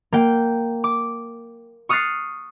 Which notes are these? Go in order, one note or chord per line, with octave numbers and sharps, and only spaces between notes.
A#3 G5
D6
C#6 D#6 F6 F#6 A6 C7